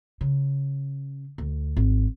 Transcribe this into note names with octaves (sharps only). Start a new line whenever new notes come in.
C#3
D2
G#1